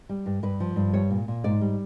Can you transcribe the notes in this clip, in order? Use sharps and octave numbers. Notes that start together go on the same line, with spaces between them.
G3
G2
G2 B4
F3
G2
G3 C#5
A#2
A#2
G#2 D5
G3